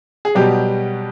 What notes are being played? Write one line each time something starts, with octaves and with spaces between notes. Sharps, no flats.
G#4
B2 F#3 G3 B3 G4